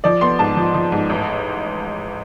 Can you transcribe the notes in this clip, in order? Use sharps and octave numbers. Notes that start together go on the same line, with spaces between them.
F3 D5
B3 C6
G#2 A5
F3
F3
G#2
A1